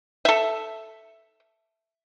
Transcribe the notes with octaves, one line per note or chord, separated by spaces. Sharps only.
A4 E5